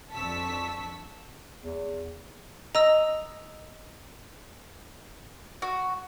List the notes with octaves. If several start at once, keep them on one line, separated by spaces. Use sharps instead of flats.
F2 D4 A5 C#6 E6 B6
E2
D#5 A#5 E6
F#4